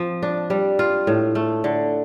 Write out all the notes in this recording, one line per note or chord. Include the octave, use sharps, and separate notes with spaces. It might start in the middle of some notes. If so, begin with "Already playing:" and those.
Already playing: F3 C4
D4
G3
F4
A2
A3
D3